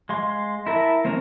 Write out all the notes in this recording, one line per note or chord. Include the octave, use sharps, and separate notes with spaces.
G#3 F5 C6
E4 A#4 E5 A5
A#3 C4 C#4 A#4